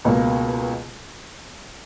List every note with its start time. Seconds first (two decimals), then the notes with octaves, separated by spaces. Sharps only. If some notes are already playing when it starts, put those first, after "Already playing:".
0.05 C#2 B2 A#3